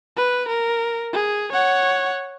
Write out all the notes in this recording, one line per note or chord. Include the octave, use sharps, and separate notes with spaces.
B4
A#4
G#4
C#5 F#5